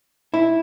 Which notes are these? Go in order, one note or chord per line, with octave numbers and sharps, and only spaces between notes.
E4